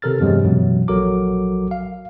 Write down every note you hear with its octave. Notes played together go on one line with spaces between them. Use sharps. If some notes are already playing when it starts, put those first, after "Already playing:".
C3 D#3 A4 A#4 F6 A6
E2 G2 C3 E3 F#3 G#3
F#2 B2 E3 F#3
A#1 F#3 F#4 A4 A#4 D6
F5